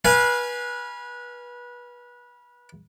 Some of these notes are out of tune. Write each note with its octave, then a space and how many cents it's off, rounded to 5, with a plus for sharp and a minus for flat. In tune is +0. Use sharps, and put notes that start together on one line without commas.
B4 -25 F5 +0 G#5 +0